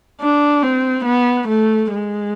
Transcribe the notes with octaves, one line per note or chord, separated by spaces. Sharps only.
D4
C4
B3
A3
G#3